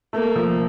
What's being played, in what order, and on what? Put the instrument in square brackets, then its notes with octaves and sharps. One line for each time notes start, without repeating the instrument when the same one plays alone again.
[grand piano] A3 [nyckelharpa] A#3
[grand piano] F3